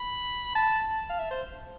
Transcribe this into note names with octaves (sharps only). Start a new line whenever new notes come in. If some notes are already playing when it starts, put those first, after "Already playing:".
Already playing: B5
A5
F5
E5
C5